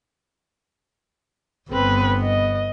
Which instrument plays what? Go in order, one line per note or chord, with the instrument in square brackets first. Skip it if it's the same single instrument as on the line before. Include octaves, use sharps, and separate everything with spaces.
[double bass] G1 B3 [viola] C4 B4
[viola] D#5